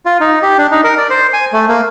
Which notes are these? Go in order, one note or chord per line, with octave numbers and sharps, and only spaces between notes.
F4
D#4
G4
D4
D#4
A#4
D5
C5
G#5
A3
A#3